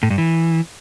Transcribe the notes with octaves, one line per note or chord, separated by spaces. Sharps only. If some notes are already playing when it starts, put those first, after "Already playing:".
A2
G2
E3